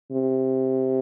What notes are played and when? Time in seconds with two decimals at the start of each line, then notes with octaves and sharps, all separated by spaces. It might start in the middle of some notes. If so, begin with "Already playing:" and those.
0.12 C3